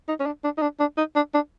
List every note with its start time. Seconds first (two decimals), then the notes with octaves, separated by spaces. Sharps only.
0.08 D#4
0.20 C#4
0.26 D4
0.44 D4
0.58 D#4
0.62 D4
0.80 D4
0.97 D#4
1.15 D4
1.34 D4